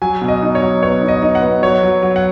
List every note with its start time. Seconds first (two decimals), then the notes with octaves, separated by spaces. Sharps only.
0.02 F#3 G#5
0.21 B2
0.28 D#5
0.42 D#4
0.55 C#5
0.62 F#3
0.82 B3 C#5
1.02 D#4
1.08 D#5
1.22 D#4
1.35 F#5
1.42 B3
1.62 F#3 C#5
1.83 F#3
2.02 F#3
2.16 F#5